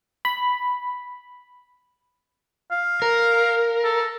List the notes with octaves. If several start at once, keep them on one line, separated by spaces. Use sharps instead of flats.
B5
F5
A#4
A4